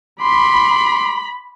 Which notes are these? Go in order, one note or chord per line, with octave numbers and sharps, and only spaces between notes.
B5 C6 D6